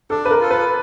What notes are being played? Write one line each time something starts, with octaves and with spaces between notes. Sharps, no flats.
D4 A4
B4
A#4
F4 A4
B4